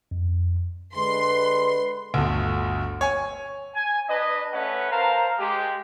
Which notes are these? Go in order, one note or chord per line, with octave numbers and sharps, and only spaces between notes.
F2
D3 G#3 B4 C6
G1 D2
C#5 G#5
G#5
D4 B4 D#5
A3 C#4 B4 F#5
A#4 C5 F5 A5 A#5
G#3 G4